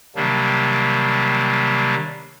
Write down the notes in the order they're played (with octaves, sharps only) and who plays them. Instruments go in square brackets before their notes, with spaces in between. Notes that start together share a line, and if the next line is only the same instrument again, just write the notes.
[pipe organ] C3 D#3 F#3 G3 A#3 D4